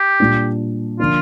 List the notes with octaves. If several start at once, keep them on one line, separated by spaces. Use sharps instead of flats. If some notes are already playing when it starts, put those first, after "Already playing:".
Already playing: G4
A#2 G3 D4
D3 F3 A#3 D4 F4